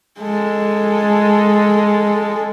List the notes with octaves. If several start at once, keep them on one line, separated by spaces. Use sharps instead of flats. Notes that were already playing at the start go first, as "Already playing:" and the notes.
G#3 A4